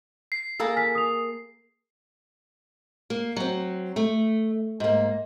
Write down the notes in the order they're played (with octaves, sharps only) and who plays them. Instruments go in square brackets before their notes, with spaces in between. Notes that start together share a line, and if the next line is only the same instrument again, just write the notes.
[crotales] C7
[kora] A#3 G#4 A4
[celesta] G#5 F6 B6
D#6 F7
[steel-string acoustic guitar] A#3
F#3 C4
A3
G#2 A#3